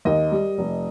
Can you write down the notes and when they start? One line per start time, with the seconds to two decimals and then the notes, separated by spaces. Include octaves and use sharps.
0.05 D#2 D#5
0.32 G3
0.58 F1